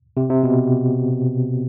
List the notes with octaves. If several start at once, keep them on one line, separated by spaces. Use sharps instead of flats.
C3
C3
B2